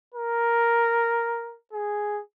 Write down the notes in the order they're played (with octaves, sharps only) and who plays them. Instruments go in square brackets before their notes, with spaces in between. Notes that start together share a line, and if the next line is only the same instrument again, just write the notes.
[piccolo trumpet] A#4
G#4